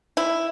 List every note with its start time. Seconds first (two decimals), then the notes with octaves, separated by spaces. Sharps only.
0.17 E4